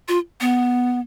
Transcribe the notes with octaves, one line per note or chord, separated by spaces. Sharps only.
F4
B3